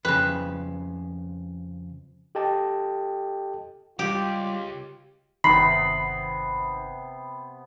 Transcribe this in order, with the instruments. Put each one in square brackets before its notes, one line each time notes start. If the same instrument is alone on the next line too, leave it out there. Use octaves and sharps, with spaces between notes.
[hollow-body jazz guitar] F2 C#3 [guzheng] B4
[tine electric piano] G4 A4 D#5 G5 A5
[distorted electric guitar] C#2 [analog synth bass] G3 [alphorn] F4 [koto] G4
[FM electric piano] G1 D#3 [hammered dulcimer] C3 B3 [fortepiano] B5 [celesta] C7